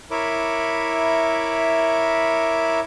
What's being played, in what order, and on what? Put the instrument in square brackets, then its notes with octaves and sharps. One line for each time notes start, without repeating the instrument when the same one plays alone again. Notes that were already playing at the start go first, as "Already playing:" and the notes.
[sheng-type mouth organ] E4 A#4 C#5 E5 B5 D6